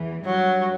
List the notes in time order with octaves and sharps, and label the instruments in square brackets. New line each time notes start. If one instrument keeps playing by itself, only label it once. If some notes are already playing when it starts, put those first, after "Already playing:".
Already playing: [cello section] E2 E3
[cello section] G2 G3 [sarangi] F#3